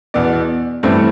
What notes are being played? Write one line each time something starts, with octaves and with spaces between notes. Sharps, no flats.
E2 B2 B3 D5
G2 E3 A3 C4